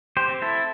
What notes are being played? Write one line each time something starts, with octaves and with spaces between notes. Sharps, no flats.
G4 C5
C4
E4 A4